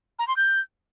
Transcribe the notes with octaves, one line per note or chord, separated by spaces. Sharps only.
A#5
C6
G6